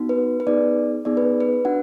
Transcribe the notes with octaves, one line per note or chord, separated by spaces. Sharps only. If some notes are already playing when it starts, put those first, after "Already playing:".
Already playing: B3 D#4 F#4
B4
B4
B3 D#4 G#4 D5
B3 D#4 G#4 D5
B4
B4
D4 F#4 F#5